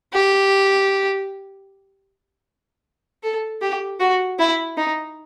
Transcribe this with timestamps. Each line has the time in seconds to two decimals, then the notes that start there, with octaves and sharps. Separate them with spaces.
0.13 G4
3.23 A4
3.62 G4
4.00 F#4
4.39 E4
4.77 D#4